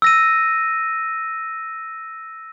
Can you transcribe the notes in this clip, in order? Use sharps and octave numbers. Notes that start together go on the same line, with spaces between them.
E6 A#6 D#7